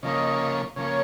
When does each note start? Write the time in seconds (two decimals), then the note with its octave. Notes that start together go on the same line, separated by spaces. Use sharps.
0.03 C#3 F3 A#3 C#4 D#5
0.76 C#3 F3 A#3 C#4 C#5